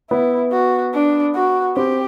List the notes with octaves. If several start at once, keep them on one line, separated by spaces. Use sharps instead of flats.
B3 E4
F#4
D4
F#4
C4 G4